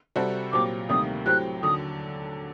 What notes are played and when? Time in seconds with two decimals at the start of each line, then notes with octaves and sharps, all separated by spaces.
0.16 C3 G3 C4 F#4 A4
0.52 A#2 F#3 C4 G4 D6
0.89 D2 C3 D#3 G3 A#3 D#6
1.26 A2 F#3 C4 G4 F#6
1.63 D#2 D3 F#3 D#6